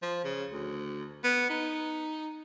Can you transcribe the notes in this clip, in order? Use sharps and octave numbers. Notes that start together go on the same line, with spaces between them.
F3
C#3
D2
B3
D#4